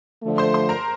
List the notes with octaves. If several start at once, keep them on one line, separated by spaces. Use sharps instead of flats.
D3 F3 A3
C5 C6
C5 C6
A#4 A#5